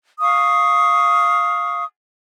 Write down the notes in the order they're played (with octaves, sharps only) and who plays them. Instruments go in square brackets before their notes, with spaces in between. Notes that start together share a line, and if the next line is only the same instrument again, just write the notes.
[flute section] F5 C#6 D#6